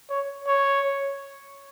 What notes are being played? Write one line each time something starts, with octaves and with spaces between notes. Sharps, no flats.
C#5
C#5